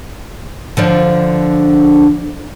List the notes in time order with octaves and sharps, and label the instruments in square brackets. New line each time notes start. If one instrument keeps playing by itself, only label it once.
[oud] D3 F3 D4